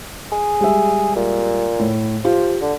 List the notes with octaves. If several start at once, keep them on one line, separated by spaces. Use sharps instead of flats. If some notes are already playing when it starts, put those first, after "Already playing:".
G#4
G3 G#3 E5
A#2
A2
F3 F4 G4
D3